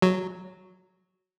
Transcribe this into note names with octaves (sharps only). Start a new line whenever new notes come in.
F#3